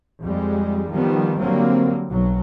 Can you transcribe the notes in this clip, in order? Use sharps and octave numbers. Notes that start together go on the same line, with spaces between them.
F2 G3 G#3
D#3 F3 G3 B3
D3 F#3 G3 A#3 C4
B1 F#3